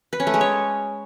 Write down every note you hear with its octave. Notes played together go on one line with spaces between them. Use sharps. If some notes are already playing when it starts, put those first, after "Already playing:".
B4
C#4
A3
G#3
C#5